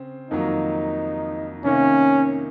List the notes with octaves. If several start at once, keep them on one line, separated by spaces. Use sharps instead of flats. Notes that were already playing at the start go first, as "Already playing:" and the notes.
Already playing: C#3 C4
F2 D#3 F#3 A#3 D#4
C3 D#3 A#3 C#4 D#4